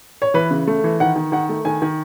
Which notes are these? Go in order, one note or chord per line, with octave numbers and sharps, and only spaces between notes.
C#5
E3 B4
C#3
A3
E3
D#3 F#5
D#3
D#3 F#5
A3
D#3 G#5
D#3